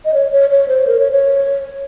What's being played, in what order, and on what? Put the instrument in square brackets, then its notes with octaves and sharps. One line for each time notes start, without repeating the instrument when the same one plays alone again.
[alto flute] D#5
C#5
C#5
C#5
C5
A#4
C#5
C#5